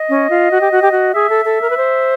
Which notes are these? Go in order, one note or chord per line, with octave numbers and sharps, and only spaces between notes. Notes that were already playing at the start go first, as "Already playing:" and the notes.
Already playing: D#5
C#4
F4
F#4
G4
F#4
G4
F#4
G#4 E5
A4
A4
A#4
B4
C5